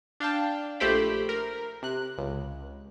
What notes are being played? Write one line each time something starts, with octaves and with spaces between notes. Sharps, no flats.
D4 F5 G5 A5
A#1 A3 G4 C5 G5 B5
A#4
C3 F#6
C#2